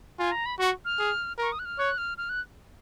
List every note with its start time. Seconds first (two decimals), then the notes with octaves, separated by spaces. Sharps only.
0.19 F4 G#5
0.31 A#5
0.46 B5
0.59 F#4 C#6
0.85 F6
0.99 G#4
1.38 A#4 C#6
1.52 D#6
1.59 F#6
1.65 F6
1.78 C#5 F#6
1.98 F6
2.18 F6
2.29 F#6